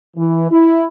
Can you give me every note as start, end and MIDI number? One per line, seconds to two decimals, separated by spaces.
0.16 0.49 52
0.51 0.87 64